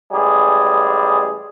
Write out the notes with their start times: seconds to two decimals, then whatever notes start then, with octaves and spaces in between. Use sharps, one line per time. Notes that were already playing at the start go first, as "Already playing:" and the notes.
0.12 A1 G3 G#3 G#4